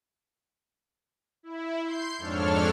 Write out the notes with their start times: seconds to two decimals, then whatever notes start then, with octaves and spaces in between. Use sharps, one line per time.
1.43 E4
1.83 C6 G6 C7
2.18 F2 G#2 D4 A4 C#5 F6